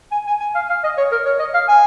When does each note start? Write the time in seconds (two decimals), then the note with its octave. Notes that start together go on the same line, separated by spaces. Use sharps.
0.12 G#5
0.27 G#5
0.40 G#5
0.55 F5
0.70 F5
0.84 D#5
0.98 C#5
1.12 A#4
1.26 C#5
1.40 D#5
1.54 F5
1.69 G#5